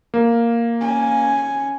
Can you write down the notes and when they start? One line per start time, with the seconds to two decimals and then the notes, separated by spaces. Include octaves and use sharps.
0.14 A#3
0.81 C#4 G#5